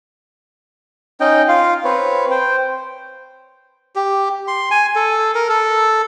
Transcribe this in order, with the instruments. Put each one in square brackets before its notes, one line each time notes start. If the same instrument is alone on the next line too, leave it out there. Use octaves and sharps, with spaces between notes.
[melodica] C#4 D#4 D#5 G5
F4 F5
C4 B4 C#5
C5 G5
G4
C6
G#5
A4
A#4
A4